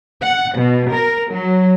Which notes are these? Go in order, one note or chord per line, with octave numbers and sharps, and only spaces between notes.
F#5
B2
A#4
F#3